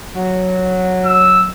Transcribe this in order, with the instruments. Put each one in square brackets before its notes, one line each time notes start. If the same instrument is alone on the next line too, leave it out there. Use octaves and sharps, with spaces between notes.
[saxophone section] F#3
[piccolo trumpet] E6